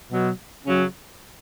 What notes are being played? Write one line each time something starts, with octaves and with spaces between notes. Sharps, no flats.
B2 F#3
C#3 F#3 C#4